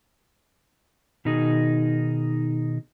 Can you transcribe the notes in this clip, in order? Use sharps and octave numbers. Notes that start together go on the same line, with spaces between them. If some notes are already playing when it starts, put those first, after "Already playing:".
B2 D#3 D#4 G#4